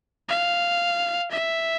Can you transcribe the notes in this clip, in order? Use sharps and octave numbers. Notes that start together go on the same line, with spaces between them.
F5
E5